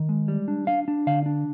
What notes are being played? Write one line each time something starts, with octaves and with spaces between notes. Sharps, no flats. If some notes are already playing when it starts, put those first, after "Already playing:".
Already playing: D#3
G#3
G3
D4
D4 F5
D4
D3 F5
D4